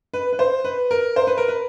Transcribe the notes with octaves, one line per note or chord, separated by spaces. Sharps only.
B4
B4
C5
B4
A#4
C5
B4
A#4
B4